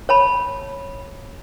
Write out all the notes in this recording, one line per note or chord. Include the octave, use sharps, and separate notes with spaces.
C#5 A5 B5